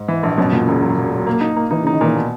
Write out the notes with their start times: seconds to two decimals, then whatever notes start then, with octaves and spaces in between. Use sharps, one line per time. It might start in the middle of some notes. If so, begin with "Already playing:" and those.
Already playing: G#2
0.08 E3
0.23 A#1
0.38 F#2 B2
0.52 E1 A#2
0.67 E1 C#3
0.83 F#3
0.97 E1
1.11 F#3
1.27 A#3
1.41 D#4
1.56 A#3
1.71 E3 D#4
1.83 C#3 D#4
1.93 D#3
2.01 A#2 E3
2.16 B2